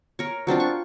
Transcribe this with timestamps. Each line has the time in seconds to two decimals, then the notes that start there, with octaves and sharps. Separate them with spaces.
0.19 A#4 C#5
0.47 F#3 C4 D4 F4
0.60 C#6